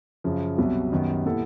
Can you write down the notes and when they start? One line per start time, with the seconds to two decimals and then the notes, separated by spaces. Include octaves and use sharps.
0.24 F#2 C#3 F3
0.58 C2 B2 F#3 B3
0.92 F#2 D#3 G3 B3
1.25 A#2 G3 B3 E4 A4